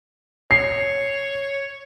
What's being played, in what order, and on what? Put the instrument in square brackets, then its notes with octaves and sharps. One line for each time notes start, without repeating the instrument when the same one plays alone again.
[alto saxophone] C#5 [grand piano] C7